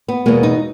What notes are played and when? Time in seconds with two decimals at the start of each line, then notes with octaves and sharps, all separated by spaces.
0.08 B3
0.26 E2 B2 G#3 A#3
0.43 D#4